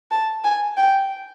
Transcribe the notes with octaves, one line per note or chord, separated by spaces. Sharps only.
A5
G#5
G5